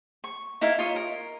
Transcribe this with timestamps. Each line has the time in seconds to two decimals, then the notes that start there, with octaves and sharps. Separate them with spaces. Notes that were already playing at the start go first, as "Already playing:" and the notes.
0.24 C#6
0.61 D#4 E4 A#4 F5
0.78 F4 C#5 D#5
0.96 A#4